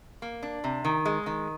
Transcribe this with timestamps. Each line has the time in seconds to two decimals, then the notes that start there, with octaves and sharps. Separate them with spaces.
0.22 A#3
0.43 D4
0.64 C3
0.85 D#3
1.05 G#3
1.26 D#3